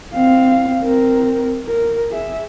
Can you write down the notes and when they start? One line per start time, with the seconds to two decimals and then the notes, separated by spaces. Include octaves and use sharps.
0.14 C4 F5
0.81 C4 A#4
1.66 A#4
2.10 G#4 E5